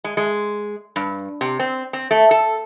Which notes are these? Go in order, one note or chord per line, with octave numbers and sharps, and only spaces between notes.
G#3
G#3
G2
C3
C4
C4
A3
A4